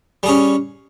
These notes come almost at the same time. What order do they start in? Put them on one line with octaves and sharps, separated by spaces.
G3 G#4 C#4